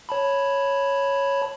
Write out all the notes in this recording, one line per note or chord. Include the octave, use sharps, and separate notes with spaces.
C#5 A5 B5